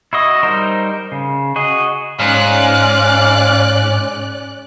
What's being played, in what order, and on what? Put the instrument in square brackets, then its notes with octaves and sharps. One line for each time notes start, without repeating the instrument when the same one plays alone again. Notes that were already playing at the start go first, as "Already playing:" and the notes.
[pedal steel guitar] E4 F#4 D#5
G3 D#4 A#4 C5
C#3
F#4 G#4 D#5
[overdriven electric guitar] G#2 [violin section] C#4 D5 F#6 [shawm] F5